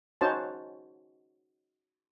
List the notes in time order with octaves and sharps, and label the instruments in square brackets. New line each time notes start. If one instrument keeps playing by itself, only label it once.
[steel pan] C#4 D#4 F#4 C5 C#5 A5